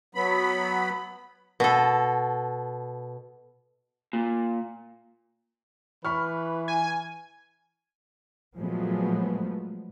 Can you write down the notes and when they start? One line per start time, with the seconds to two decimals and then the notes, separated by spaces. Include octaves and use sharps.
0.15 F#3 B3 B5
1.60 B2 A4
4.13 A#2
6.05 E3 B4 B5 C#6 F6
6.68 G#5
8.56 A#2 F3 F#3 G#3 A3 B3